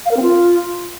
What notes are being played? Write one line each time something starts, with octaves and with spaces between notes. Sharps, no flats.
F5
A#4
C4
F4